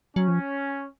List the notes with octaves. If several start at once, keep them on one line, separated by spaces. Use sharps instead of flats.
F#3 C#4
F3